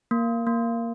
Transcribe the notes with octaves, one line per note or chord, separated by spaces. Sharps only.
A#3
A#3